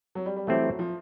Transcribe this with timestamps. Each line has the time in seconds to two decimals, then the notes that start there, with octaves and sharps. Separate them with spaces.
0.15 F#3
0.26 G3
0.36 G3
0.47 E3 F#3 A3 C4 E4 G4
0.63 F#3
0.79 F3